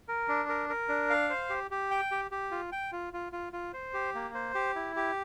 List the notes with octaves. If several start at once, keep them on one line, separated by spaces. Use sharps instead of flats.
A#4
D4
A#4
A#4
D4
F5
C5
G4
G4
G5
G4
G4
F4
G5
F4
F4
F4
F4
C5
G4
A#3
C5
G4
E4
G4